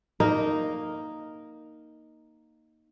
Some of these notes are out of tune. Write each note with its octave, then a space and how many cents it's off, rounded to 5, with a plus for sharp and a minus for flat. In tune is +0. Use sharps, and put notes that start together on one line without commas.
A#3 +0 D#4 +0 A#4 +0